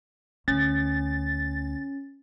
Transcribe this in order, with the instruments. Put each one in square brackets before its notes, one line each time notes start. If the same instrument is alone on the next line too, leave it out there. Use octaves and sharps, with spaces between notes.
[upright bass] D2 [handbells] C#4 [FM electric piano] A6